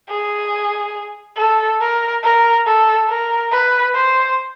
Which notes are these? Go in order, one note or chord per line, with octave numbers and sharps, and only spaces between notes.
G#4
A4
A#4
A#4
A4
A#4
B4
C5